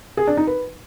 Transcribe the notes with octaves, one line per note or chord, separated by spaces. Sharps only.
G#4
D4
D#4
B4